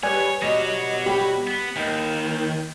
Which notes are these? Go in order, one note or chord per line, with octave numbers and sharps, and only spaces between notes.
G3 B4 C#5 G#5
B2 G3 F#4 C#5 D#5
G4 B5
B3
D#2 D#3